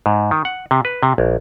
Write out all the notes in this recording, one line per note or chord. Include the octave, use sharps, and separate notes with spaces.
G#2
D#3
F#5
C3
B4
C3
A#1